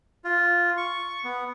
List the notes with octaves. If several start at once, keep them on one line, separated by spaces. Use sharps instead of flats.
F4
C#6
B3